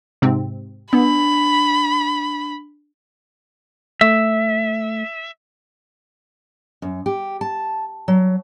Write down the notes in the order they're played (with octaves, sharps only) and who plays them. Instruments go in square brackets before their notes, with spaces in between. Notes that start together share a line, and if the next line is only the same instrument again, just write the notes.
[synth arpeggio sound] G#2 C3 C4
[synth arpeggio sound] B3 [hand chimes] D4 [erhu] B5
[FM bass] A3 [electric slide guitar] E5
[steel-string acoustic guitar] F#2
G4
A5
F#3